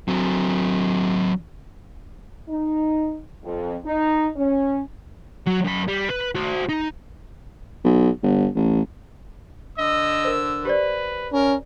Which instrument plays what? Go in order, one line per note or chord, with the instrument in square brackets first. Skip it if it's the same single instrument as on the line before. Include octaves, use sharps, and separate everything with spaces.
[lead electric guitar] F#3 C4
[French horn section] D#4
F2
D#4
C#4
[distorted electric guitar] F#3
F#2 B5
G3
B4
F#4 C5
D#4
[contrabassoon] B1
G1
A1
[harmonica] D3 E6 [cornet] D#5
[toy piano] A#4 C5
[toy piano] G4 C5 D5 [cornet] B4
[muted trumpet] C#4 [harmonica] A#4